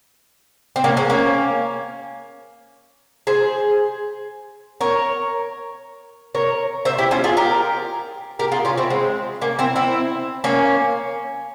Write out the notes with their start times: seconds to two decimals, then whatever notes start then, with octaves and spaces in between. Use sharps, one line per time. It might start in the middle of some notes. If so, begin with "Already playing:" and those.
0.76 C4
0.84 A#3 C#4
0.97 G#3 C4
1.10 A#3 C#4
3.27 G#4 C5
4.81 A#4 C#5
6.35 A#4 C#5
6.85 C5 E5
6.98 E4 G4
7.11 C#4 F4
7.24 F4 G#4
7.37 G4 A#4
8.39 G4 A#4
8.52 F4 G#4
8.65 C#4 F4
8.77 C4 E4
8.90 G#3 C4
9.41 A#3 C#4
9.59 C4 E4
9.76 C4 E4
10.44 A#3 C#4